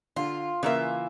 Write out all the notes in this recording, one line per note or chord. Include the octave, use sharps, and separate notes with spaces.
D3 F4
C#3 E3 A#3 F4 A#4 E5